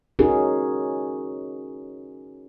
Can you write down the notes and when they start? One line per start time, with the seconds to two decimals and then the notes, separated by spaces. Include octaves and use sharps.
0.19 C#4 D#4 F#4 G#4 A#4